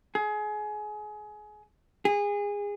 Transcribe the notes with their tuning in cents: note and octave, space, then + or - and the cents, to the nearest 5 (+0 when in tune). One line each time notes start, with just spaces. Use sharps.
G#4 +25
G#4 -25